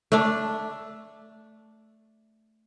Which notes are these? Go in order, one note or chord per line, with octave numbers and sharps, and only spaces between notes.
A3 D4